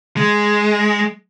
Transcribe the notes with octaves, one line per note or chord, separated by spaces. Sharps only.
G#3